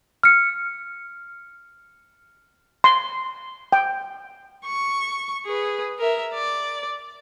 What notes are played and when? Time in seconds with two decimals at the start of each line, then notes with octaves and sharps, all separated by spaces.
0.23 F6 C#7
2.84 C6
3.73 G5
4.65 C#6
5.46 G#4 B4
5.99 A#4 E5
6.34 D5